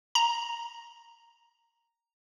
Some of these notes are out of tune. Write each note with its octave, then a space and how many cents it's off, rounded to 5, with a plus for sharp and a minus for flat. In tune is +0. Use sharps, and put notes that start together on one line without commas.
A#5 +0